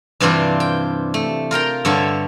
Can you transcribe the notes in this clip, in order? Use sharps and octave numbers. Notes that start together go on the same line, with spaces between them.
G2 C3 E3 C4 D4 F4
G5
A3
F4 A#4 G5 A#5
G2 D3 A4 C#5 E5 A5